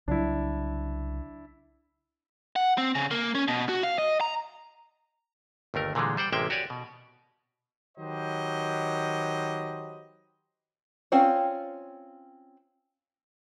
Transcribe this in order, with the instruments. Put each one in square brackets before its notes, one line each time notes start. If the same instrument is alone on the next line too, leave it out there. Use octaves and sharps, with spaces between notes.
[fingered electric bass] C2 C#3 F#3 [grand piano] D4 E4
[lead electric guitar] F#5
C4
C#3
A#3
C#4
B2
F#4
F5
D#5
A#5
[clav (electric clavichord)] G1 D#2 A3 A#4
A#2 D3 E3 G3 G#3
G3 C5 F#5 G5
A1 C3 G#3 A#3 E5 G5
F#4 G4 C#5 D5 G#5
B2
[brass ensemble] D#3 F#3 G4 B4 C5 D#5
[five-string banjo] C4 C#4 F4 D5